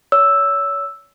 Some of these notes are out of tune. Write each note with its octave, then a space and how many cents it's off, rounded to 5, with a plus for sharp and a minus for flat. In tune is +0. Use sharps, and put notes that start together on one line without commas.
C#5 +30 E6 +0